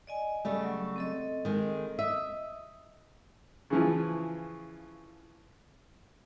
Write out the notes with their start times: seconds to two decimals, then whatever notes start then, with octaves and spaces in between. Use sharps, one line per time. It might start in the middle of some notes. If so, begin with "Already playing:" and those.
0.07 D5 D#5 G#5
0.45 C#3 G3 A3
0.64 F#3 C#6
0.96 C4 A4 D#5
1.45 D#3 G#3
1.99 D#5 E5 D#6
3.70 C#3 E3 F3